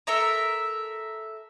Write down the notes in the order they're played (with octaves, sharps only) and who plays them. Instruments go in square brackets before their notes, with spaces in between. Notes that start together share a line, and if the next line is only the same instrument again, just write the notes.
[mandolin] A4 A#4 E5 A#5